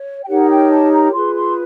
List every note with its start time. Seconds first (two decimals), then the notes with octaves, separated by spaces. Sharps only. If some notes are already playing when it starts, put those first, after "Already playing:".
Already playing: C#5
0.23 G5
0.28 D#4 G4 A#4 C#5 F#5
0.50 G5
0.70 A5
0.92 A#5
1.13 F4 G#4 B4 C6
1.34 C6